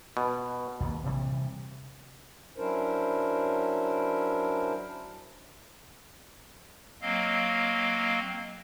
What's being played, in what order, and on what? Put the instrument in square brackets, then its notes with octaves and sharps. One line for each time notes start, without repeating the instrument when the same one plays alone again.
[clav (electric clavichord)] B2
[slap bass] A#1 D#2 E3 A#3
C3 E3 G3
[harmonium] F#3 C#4 D4 E4 A#4 C5
[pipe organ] F#3 A#3 C4 D#5 F5